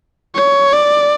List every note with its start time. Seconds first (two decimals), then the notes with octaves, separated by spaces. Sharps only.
0.35 C#5
0.73 D5